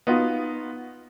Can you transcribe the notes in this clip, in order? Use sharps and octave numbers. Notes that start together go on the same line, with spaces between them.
B3 D#4 F4 F#4